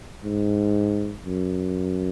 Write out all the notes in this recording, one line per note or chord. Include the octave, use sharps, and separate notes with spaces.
G#2
F#2